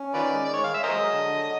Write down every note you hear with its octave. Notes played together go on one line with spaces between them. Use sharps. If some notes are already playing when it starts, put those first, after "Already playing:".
Already playing: C#4
D#3 F4 B4 D5
G#3
D5
G#3 C#5
F5
G#3 E5
A#4 C5 D#5
F#3
D3
F#3